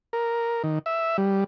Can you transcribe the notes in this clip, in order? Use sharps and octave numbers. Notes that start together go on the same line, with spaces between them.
A#4
D#3
E5
G3